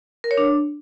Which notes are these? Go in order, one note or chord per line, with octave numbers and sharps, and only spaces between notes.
A#4
C#5
D4